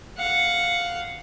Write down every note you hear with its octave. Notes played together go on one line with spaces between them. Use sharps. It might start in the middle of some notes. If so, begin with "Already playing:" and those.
F5 F#5